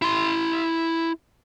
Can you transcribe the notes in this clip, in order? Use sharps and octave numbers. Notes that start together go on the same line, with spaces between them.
E4 C6